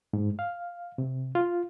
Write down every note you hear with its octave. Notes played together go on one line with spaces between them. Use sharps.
G#2
F5
C3
F4